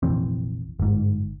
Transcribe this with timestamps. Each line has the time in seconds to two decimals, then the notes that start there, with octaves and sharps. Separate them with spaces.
0.03 F1 A#1 E3 C4
0.80 G1 G#2